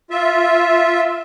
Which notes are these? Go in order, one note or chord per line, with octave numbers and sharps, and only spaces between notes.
F4 E5